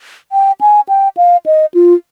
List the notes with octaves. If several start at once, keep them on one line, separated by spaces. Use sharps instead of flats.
G5
G#5
G5
F5
D#5
F4